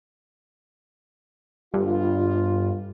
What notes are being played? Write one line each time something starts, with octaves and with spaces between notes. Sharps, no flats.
G1 G2 G3 F4